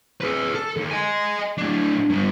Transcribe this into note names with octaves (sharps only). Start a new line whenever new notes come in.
G#4 B4
A4
D#2
D#5 G#5
A2 D4
G2 B3